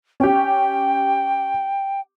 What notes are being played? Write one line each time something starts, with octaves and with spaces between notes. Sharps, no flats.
C#4 G4 G5